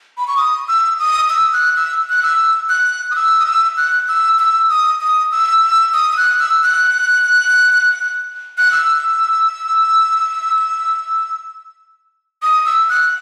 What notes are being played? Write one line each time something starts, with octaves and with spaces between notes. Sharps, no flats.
B5
C#6
D#6
E6
D#6
E6
F#6
E6
F#6
E6
F#6
D#6
E6
D#6
E6
F#6
E6
E6
D#6
D#6
E6
E6
D#6
E6
F#6
E6
F#6
F#6
E6
D#6
E6
F#6